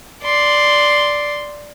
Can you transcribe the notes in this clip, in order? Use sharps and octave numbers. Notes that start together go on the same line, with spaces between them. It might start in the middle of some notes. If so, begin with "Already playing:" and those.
D5 C6